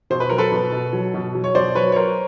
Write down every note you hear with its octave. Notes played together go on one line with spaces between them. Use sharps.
B2 C5
B4
F#3 A#4
A4 B4
B2
B2
F#3
B2
F#3
C#5
B2 C5 D5
F#3 B4 C#5
C#5
F#3 A#4 C5